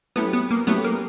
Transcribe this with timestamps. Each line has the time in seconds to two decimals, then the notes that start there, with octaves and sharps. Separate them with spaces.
0.16 F#3 A3 B3 C#4 E4 G4
0.33 B3
0.51 A#3
0.67 F#3 A3 B3 C#4 E4 G4
0.84 A#3